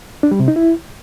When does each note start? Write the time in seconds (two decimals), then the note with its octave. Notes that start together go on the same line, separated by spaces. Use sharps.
0.23 D4
0.31 G3
0.40 C3
0.48 D#4
0.56 E4